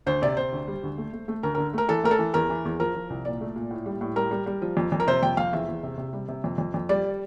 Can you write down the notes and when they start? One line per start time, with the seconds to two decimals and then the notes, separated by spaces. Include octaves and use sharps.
0.06 D2 C5
0.22 C3 D5
0.37 C3 C5
0.52 D2
0.68 G3
0.83 D2
0.98 A3
1.13 A3
1.28 A3
1.43 D2 A#4
1.55 D3 A#4
1.74 A3 A#4
1.88 E3 A4
2.04 A3 A#4
2.11 A4
2.19 E3
2.34 E2 A#4
2.49 E3
2.65 E2
2.80 F3 A#4
2.95 F3
3.10 C2
3.25 A#2 D5
3.41 A3
3.56 A#2
3.71 A2
3.86 G3
4.01 A2
4.16 G3 A#4
4.31 G3
4.46 G3
4.62 F3
4.77 F2
4.92 F2
5.00 A#4
5.07 C3 C5
5.23 F2 G5
5.37 F2 F5
5.53 E2 E5
5.68 E2
5.83 C3
5.98 C3
6.13 G3
6.29 C3
6.44 F2
6.58 F2
6.74 F2
6.89 G3 D5